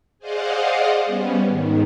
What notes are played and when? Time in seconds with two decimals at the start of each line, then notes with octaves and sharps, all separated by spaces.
0.19 G#4 C5 D5 D#5 F5 F#5
1.05 G3 B3 C#4
1.45 G#2 D#3